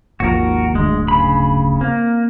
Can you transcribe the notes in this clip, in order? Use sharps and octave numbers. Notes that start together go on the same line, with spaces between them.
G#1 D#2 F3 F#4 A#4
D1 G1 D2 G#3
C#3 B5
A#3 C4